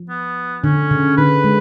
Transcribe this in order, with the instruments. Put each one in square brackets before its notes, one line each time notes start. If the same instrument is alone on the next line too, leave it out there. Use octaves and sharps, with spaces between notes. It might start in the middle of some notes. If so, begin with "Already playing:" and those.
Already playing: [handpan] F3
[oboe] B3
[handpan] D3 [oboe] C#4
[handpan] C#3
[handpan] D3 [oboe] B4
[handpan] G#3